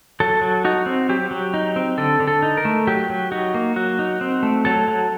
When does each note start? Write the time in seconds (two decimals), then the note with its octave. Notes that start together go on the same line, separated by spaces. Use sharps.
0.20 F#3 A4
0.42 F#3
0.65 D#4 F#4
0.86 C4
1.09 F#3 G4
1.31 F#3
1.54 D#4
1.76 C4
1.98 D3 A4
2.20 D3
2.28 A4
2.43 D#4
2.57 A#4
2.65 A3
2.87 F#3 G4
3.10 F#3
3.32 D#4 F#4
3.54 A#3
3.76 F#3 F#4
3.99 D#4
4.21 C4
4.43 A3
4.65 F#3 A4
4.88 F#3